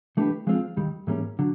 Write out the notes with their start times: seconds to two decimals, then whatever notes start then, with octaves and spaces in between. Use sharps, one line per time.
0.17 E3 A3 D4 G4 B4
0.47 F3 G#3 C4 F4
0.77 D#2 D#3 G3
1.07 G#2 E3 G3 A#3 C#4
1.39 D3 F#3